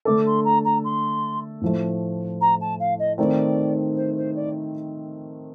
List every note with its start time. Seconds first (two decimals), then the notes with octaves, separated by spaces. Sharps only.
0.05 D3 A3 D4 A4 D6
0.26 C6
0.44 A#5
0.64 A#5
0.84 C6
1.61 A2 F3 A3
2.40 A#5
2.60 A5
2.79 F5
2.99 D#5
3.18 D#3 A3 C4 D#4 D5
3.96 C5
4.16 C5
4.35 D5